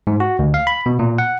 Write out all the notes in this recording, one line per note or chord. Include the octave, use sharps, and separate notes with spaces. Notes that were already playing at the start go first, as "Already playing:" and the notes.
G#2
F#4
D2
F5
B5
B2
A#2
F#5